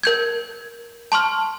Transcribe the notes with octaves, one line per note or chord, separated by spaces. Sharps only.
A#4 G6 G#6
A5 C6 C#6 F6